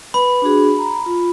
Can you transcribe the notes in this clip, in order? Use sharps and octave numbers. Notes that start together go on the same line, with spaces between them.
B4 B5
D4 F#4 G#4
A#5
F4